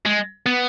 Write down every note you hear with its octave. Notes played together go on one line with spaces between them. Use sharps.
G#3
B3